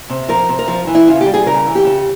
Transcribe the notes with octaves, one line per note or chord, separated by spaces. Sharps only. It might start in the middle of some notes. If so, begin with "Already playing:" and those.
C3
F3 A#4
C3
A#4
F3
E3
E4
C#3 F4
G4
G3
G#4
C#3 A#4
E3
G4
C#3